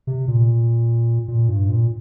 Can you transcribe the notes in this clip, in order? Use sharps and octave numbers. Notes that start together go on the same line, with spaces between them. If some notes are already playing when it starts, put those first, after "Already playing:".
C3
A#2
A#2
G2
A#2